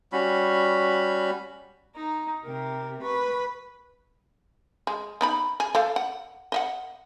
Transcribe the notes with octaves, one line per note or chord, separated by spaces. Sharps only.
G3 C#4 F#4 B5
D#4 A#5
C3 G4 A#4
B4 C#6
G#3
B3 D#4 B5
G#4
A3 A4 F5
F#5
D#5 E5 F#5